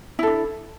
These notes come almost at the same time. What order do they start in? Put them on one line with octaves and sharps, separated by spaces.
E4 A4 D4